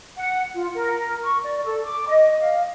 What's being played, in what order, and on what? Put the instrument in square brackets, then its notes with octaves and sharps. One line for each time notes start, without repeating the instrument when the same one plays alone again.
[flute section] F#5
F4
A#4
C#6
D5
A4
D6
D#5
F5